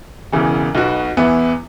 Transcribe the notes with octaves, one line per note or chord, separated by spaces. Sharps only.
E1 E2 C#3 E3
B1 B2 B3 F#4
E2 E3 B3 E4